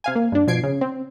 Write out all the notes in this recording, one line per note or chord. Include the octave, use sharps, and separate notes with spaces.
C3 F5 G#5
A#3
G2 D4
B2 F3 G#6 C7 D7
C#3
C4